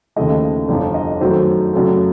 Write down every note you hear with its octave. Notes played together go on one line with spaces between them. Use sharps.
D#2 C#3 F3 A3 D#5
G1 F2 D3 F3
D#5
F#2 D#3 F#3 A3 C5
F#2 C#3 F#3 A3